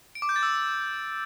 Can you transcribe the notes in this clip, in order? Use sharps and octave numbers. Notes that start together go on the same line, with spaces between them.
D7
D6
G6
A6
E6